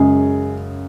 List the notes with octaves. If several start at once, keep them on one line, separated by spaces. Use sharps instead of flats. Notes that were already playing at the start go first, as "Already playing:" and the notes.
Already playing: F#2 C#3 G#3 G#4